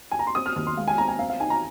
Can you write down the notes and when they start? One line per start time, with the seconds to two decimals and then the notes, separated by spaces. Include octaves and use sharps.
0.11 G#5
0.19 A#5
0.27 C6
0.35 C4 D#6
0.46 F6
0.56 D#2 F6
0.67 C6
0.77 G#3 F5
0.88 G#5
0.98 C4 A#5
1.08 G#5
1.19 C4 F5
1.29 F5
1.40 D#4 G#5
1.50 A#5